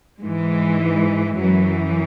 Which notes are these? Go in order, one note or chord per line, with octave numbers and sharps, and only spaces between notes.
G#2 E3 G#3
F#2 E3 F#3